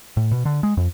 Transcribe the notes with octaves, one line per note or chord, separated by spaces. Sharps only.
A2
B2
D3
G#3
F2